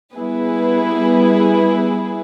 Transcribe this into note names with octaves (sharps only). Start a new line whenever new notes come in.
G3 B3 E4 G#4 B4